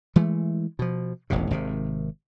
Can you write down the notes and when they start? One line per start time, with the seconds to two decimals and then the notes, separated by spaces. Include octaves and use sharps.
0.16 E3 G#3 A3
0.79 B2 F3
1.30 E1 A1 F2 C3
1.51 G#1 C3 D#3